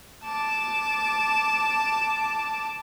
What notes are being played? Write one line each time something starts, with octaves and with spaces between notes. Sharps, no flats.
A5 D6